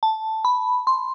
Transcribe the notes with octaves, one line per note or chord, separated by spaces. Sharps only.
A5
B5
C6